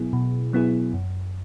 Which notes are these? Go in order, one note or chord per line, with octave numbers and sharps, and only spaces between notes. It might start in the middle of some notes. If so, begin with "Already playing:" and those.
Already playing: B2 F#3 B3 E4 G#4
B2
F#3 B3 E4 G#4
F#2